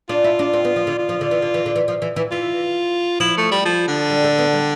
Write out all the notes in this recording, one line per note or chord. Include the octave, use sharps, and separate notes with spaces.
D4 F4
E4
D4
C4
B3
F3
D3
F4
F3
D3
E3
D3
E3
D3
E3
F3
E3
E3
E3 F4
F3 E4
A3
G3
F3
D3
G3
A3
B3
G3